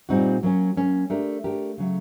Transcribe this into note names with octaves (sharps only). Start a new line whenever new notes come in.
A#2 G3 C4 D#4 F#4
F#3 A#3 C#4
F#3 A#3 C#4
A3 D4 G4 A#4
A3 D4 G4 A#4
C#3 F#3 A3